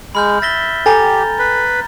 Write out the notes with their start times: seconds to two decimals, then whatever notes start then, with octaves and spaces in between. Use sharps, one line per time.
0.15 G#3 B5 F6 G6
0.42 E5 A6 A#6 G7
0.86 G4 A4 G5 G#5 A#5 A6
1.39 B4